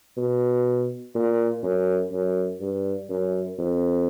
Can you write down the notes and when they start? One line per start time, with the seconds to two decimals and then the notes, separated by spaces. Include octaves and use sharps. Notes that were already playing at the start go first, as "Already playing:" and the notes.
0.17 B2
1.15 A#2
1.63 F#2
2.12 F#2
2.61 G2
3.10 F#2
3.58 F2